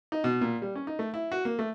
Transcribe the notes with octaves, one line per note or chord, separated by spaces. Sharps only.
D#4
B2
A#2
G3
C#4
D#4
A3
E4
F#4
A#3
A3